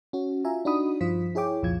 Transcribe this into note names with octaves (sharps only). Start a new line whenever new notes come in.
C#4 F#4
F4 F#4 E5 G#5 A#5
D4 D#4 F#4 B5 D#6
G2 F3 F4 C5 B6
E4 G#4 C#5 G5 D6
C2 F2 A#2 F3 F4 G#6